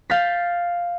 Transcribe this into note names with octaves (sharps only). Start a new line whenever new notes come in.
F5 G6 A6 B6